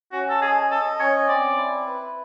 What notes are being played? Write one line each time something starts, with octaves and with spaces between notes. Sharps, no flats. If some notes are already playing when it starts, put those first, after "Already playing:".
C#4 F#4
A4
G#4 D#5
A4 D#5
C#4 C#5
C4 D5
E4
B4